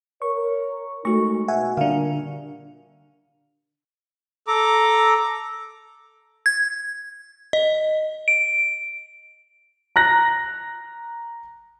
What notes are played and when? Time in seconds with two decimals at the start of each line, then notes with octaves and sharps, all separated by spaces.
0.22 A#4 C#5 C#6
1.05 G#3 A3 D#4 F#4 A4 C#6
1.48 B2 E5 F#5 G#5
1.77 A#2 D3 G3 D4 A#4 F5
4.47 A4 A#5 D6
6.46 G#6
7.53 D#5
8.28 D7
9.96 A#5 F#6 A#6